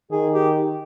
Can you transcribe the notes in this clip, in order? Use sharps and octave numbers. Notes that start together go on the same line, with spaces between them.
D#3 G#4
G4